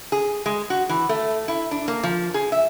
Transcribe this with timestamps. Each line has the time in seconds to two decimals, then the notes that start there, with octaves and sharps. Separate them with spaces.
0.12 G#4
0.46 G#3
0.70 F#4
0.89 E3
1.09 A3
1.48 E4
1.71 D4
1.88 A#3
2.03 F3
2.34 G#4
2.52 E5